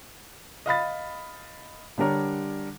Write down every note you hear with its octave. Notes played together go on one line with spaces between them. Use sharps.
D#5 F5 B5 A6
D3 G3 D4 A#4 C#5